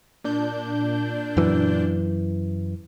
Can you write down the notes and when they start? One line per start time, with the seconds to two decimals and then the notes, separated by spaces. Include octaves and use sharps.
0.24 A#2 D4 G6
1.37 F#2 E3